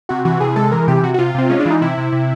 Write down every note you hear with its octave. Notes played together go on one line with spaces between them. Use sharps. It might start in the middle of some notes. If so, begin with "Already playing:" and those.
C3 F#4
E3 F#4
C3 G#4
G#3 A4
E3 A#4
C3 G4
C3 F#4
F#4
C3 F4
C3 C4
G#3 C#4
D4
E3 D#4
C3 E4
C3
C3